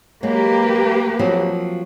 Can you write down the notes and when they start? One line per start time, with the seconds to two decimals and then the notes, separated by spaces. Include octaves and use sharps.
0.23 F#3 G#3 A#3 G4 B4
1.19 F3 F#3 C4